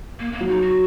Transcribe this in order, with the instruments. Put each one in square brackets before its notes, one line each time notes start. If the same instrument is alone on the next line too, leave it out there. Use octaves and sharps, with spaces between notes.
[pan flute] A#3
A#3
[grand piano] F#3
[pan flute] D#4
F#4